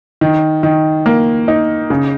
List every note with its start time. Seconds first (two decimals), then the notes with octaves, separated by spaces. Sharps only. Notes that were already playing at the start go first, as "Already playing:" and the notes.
0.21 D#3
0.63 D#3
1.06 A#3
1.48 D#4
1.90 C#3